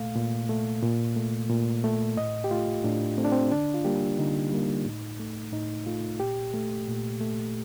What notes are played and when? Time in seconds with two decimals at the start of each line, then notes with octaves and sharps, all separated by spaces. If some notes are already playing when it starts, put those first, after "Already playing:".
Already playing: A#2 A3 F5
0.15 A#2
0.49 A3
0.83 A#2
1.16 A3
1.50 A#2
1.84 A3
2.17 A2 D#5
2.44 G4
2.51 A3 F4
2.84 A2 D4
3.18 A3 C4
3.25 D4
3.32 C4
3.51 D3 D4
3.74 F4
3.85 G3 A#3 G4
4.18 D3 D#4
4.52 G3 A#3
4.86 A2
5.19 A3
5.52 A2 D#4
5.86 A3 F4
6.20 A#2 G4
6.54 A3
6.87 A#2
7.21 A3